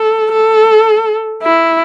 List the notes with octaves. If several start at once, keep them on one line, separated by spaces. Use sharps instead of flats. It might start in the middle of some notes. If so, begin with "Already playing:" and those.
Already playing: A4
A4
E4